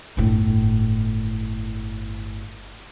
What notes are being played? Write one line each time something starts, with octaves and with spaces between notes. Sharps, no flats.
G1 A2